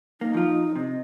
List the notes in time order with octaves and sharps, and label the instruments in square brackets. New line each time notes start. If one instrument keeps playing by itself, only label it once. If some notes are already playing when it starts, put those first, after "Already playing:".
[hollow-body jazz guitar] A#3 [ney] D#4
[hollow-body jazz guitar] F3 F4
[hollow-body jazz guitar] C3 [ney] D#5